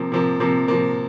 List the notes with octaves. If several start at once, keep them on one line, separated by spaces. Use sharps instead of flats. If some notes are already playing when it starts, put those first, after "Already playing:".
Already playing: C3 F3 A#3
C3 F3 A#3
C3 F3 A#3
C3 F3 A#3